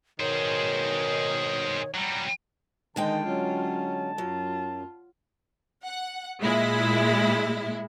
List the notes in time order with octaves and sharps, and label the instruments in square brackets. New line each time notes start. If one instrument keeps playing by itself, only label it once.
[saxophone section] B2 D#3 [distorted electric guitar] G#4 C5 [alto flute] C#5
[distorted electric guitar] F#3 G3 [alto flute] A#5
[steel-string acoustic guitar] D3 G#3 G5 [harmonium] D#3 [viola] D#4 [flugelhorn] A5
[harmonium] F#3 C#4 [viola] F4
[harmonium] F#2 [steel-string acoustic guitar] F#3 [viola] F4
[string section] F#5
A#2 G#3 E4